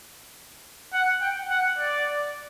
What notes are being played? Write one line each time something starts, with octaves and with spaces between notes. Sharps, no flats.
F#5
G5
F#5
D5